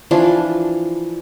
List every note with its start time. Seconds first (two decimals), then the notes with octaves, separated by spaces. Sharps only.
0.11 E3 F3 D4